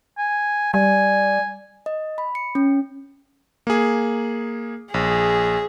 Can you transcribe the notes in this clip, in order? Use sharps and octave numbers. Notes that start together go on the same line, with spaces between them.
G#5
G3 D5 G#5
D#5
B5
C#7
C#4
A#3 G#4
A#1 G#4